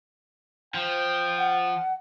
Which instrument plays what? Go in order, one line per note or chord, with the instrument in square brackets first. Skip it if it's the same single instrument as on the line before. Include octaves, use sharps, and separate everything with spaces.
[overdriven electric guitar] F3 [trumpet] G5
[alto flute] F#5